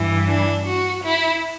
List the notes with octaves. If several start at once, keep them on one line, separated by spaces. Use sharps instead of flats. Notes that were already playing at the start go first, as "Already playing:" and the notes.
Already playing: G2 E3
D4
F#4
E4